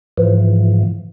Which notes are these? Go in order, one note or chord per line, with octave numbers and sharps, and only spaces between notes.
G#2 E3 F3